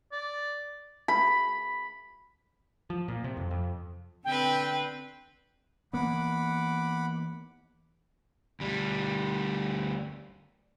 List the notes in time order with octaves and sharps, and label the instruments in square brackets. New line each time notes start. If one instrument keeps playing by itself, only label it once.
[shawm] D5
[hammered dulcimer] B5
[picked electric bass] F3
A#2
C3
F2
F2
[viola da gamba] D3 C4 B4 [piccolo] G5
[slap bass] E3 A#3 B3 [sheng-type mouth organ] F#5 B5 D6
[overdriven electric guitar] D2 G3